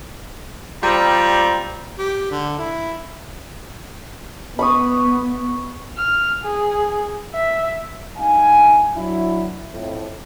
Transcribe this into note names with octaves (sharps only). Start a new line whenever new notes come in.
G3 C4 F4 D5 A#5
G4
D3
E4
B3 B5 C#6 D#6
F6
G#4
E5
G2 D#4 F5 G#5
F#3 D4 E4
F2 A2